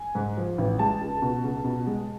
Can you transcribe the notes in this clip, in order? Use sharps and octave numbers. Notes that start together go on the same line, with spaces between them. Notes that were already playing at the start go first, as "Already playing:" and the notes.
Already playing: G#5
G#2
F3
A1
G#3 A5
C#2
B2
C#2
B2
G#3